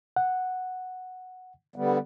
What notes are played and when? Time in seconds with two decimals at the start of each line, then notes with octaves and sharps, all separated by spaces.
0.16 F#5
1.76 D3 G3 B3